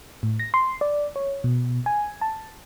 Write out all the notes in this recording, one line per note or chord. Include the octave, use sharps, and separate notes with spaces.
A2
A#6
C6
D5
C#5
B2
G#5
A5